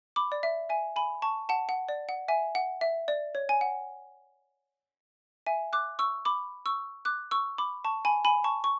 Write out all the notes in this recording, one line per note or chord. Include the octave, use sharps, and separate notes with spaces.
B5 D6
D5
E5
E5 G#5
G#5 B5
A5 C#6
F#5 A5
F#5
D5
F#5
E5 G#5
F#5
E5
D5
C#5
G#5
F#5
E5 G#5
D6 F#6
C#6 E6
B5 D6
C#6 E6
D6 F#6
C#6 E6
B5 D6
A5 C#6
G#5 B5
G#5 B5
A5 C#6
C#6